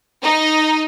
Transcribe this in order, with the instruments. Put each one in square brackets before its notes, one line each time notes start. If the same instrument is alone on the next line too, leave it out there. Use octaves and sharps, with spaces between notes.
[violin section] D#4